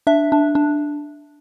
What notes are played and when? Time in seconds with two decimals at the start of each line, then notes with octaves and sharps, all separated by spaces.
0.07 D4 E5
0.32 D4
0.55 D4